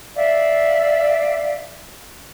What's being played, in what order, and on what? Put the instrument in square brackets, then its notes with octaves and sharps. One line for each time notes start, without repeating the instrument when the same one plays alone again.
[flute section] D5 E5 F5